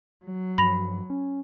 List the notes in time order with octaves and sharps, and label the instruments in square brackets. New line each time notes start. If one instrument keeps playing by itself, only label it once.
[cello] F#3
[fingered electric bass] G2 F3 [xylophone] B5 A#6 F7
[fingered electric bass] C#4